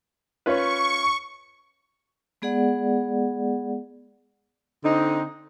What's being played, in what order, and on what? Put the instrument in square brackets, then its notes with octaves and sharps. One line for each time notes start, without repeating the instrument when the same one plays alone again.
[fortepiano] C#4 F4 B4 [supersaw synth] C#6
[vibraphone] G#3 B3 G#4 D5 F#5
[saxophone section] D3 C4 D#4